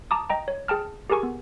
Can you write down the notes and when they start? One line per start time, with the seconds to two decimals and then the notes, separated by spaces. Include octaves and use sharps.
0.11 A5 A#5 D6 D#6
0.30 D#5 G5 A#5
0.48 C#5
0.68 G#4 G5 A5 F6
1.10 G4 G#4 A#4 G#5 C#6
1.23 B3